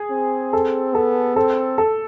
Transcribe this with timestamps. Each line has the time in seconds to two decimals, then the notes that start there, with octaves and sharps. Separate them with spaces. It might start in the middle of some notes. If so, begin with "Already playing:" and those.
Already playing: G#4
0.11 C4
0.53 A4
0.95 B3 A4
1.36 C4 A4
1.78 A4